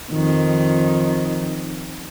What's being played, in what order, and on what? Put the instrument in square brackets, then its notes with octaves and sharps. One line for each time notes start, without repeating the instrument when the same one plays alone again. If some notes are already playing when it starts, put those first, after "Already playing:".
[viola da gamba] F2 D#3